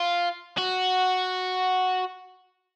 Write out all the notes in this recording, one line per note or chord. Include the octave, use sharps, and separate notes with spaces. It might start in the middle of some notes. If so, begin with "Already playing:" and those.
Already playing: F4
F#4